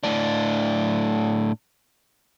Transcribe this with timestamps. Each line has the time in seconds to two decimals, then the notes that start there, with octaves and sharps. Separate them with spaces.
0.03 A2 D4